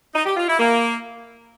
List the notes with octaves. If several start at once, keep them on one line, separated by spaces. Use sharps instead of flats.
D#4
G4
F4
E4
A#3